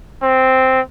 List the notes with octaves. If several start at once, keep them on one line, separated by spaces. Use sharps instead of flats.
C4